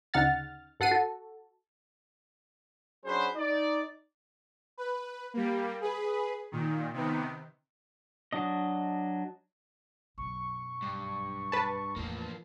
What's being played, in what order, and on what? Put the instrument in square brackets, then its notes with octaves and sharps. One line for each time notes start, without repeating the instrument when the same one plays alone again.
[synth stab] D2 C#3 D#4 F#5 F6 A6
G2 A4 F#5 C7 D#7
F#4 A4
[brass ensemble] F#3 C#4 D4 G#4 B4 C5
D#4 D5
[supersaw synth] B4
G3 A#3
G#4 B4
A#2 D#3
C3 D#3 B3
[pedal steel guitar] F#3 D4 D#5
[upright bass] B1 F#2 [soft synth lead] C#6
[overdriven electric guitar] G2
[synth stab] B4 A5
[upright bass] E2 A2 [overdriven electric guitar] F3 A#3